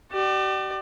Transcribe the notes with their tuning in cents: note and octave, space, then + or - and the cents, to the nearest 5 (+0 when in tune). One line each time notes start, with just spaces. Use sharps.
G4 -40 D5 +30